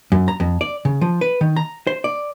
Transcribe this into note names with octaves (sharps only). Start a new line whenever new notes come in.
F#2
A#5
F2
D5
C#3
F3
B4
D#3
A#5
C5
D5